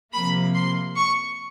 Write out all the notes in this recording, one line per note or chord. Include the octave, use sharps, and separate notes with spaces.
C3 F3 A#3 B5
C6
C#6